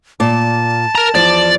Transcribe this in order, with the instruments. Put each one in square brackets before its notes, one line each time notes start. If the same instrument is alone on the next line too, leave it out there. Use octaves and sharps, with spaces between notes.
[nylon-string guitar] A#2 D5 [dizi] A5
[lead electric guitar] A#4 A#5
[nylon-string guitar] E2 F3 [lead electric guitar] D5